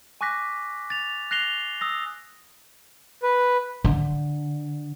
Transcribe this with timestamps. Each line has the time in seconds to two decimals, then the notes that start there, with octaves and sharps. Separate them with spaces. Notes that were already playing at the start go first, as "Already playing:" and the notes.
0.21 G#5 C#6 D6 F#6 A#6 B6
0.90 A6 F7
1.31 F#6 A#6 C7 F7 G7
1.81 D#6 E6 A#6
3.23 B4
3.85 D3